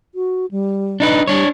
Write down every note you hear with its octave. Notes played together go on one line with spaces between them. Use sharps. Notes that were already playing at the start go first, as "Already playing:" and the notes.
F#4
G3
D4 D#4 B4
G3 D4 C#5